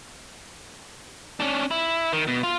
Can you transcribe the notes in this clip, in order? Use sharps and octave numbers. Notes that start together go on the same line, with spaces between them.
C#4 D4
E4
D#3
B2
F4